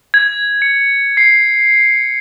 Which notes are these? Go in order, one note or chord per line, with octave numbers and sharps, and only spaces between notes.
G#6
C#7
C7